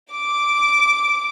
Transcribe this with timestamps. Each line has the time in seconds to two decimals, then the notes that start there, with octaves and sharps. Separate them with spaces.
0.12 D6